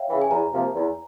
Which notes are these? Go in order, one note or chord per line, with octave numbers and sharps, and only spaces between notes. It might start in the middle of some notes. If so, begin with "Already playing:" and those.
Already playing: C#5 E5 F5 G5
C#3 E3
G#5
E2 A#5
C3 F3 A#3
E2